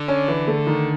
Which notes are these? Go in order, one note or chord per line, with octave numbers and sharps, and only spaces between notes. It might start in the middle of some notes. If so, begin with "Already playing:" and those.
Already playing: D3
C#4
E3
A3
D#3